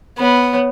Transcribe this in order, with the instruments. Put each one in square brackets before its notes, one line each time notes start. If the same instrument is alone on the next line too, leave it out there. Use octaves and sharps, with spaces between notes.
[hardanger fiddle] B3 [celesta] C#5 B5
[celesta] C#5 B5